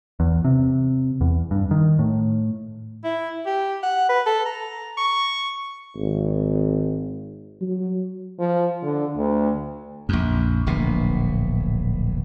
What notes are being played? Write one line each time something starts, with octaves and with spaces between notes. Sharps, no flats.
E2
C3
E2
G2
D#3
A2
E4
G4
F#5
B4
A4
A#5
C#6
G#1
F#3
F3
D3
D2
A#1 F2
D1 A#1 B2